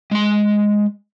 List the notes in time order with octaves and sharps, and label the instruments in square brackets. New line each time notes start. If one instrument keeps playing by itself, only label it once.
[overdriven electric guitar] G#3 C6